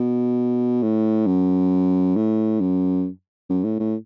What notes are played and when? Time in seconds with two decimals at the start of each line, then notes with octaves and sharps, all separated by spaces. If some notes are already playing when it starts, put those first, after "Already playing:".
Already playing: B2
0.83 A2
1.26 F#2
2.16 A2
2.60 F#2
3.50 F#2
3.64 A2
3.79 A2